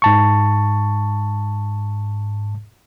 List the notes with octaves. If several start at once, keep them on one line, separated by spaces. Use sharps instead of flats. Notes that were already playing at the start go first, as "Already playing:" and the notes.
G#2 A5 C#6